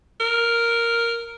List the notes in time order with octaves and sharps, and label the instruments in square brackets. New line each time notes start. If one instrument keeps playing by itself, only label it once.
[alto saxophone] A#4